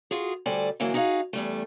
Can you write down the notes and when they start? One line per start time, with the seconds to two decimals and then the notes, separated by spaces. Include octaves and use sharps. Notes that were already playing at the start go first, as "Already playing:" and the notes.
0.11 F4 F#4 G#4
0.46 D2 G3 A4 C5 D5 G#5
0.80 G#2 D3 E3 F#3 A#3
0.94 D#4 F#4 G#4 C#5 F5
1.33 E2 G3 A3